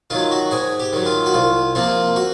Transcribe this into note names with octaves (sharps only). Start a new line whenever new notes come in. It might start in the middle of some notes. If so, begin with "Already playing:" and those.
D#3 F#3 F4
F#4
G#2 G#4
G4
D#3 F#3
F4
F#4
C2 F4
C3 F3 A#3 F4
F#4